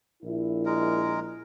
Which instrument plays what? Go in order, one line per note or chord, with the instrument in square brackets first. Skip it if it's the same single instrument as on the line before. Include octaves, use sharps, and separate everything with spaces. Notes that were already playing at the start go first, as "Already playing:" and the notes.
[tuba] A#1 [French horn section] E4
[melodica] G#3 A#4